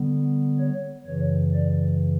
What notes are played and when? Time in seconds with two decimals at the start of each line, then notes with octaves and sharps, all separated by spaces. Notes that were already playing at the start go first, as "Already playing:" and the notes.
Already playing: D3 G3 B3
0.60 C#5
1.06 F#2 C#3 E3 C#5
1.53 D5